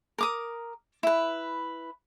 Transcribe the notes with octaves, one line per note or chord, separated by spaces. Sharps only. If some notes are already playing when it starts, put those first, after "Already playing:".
A#4 D6 D#6
E4 B4